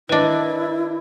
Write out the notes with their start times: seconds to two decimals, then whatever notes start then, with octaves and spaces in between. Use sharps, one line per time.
0.09 D#3 D4 E4 B4 D#5